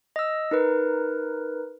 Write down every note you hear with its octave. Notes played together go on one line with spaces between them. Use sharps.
D#5 E6
D#4 A#4 B4